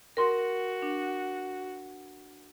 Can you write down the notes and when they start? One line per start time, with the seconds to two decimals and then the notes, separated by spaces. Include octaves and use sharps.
0.17 F#4 A#4 C6
0.82 D4